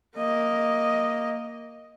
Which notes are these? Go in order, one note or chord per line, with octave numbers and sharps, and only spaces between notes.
A#3 D#5